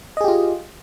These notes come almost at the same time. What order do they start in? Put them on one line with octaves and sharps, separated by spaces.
D#5 G#4 G4 F4